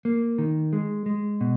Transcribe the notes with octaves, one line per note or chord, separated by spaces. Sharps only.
A#3
D#3
G#3
G#3
B2